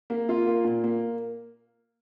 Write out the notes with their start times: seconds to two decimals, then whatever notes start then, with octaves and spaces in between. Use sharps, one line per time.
0.10 A#3
0.29 F4
0.47 A#3
0.64 A#2
0.84 A#3